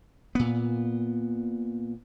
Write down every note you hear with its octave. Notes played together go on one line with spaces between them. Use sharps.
A#2 B3